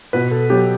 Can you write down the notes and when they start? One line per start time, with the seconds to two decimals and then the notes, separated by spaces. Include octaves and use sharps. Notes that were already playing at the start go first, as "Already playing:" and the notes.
0.13 B2 B4
0.31 A4
0.50 F#3 B3 G4